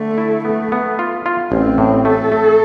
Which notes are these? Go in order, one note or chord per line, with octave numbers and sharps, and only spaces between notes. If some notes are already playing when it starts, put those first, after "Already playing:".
Already playing: D3 A3
E4
A3 B3
B3
F4
F4
A1 C4
A2
A3 A4
A3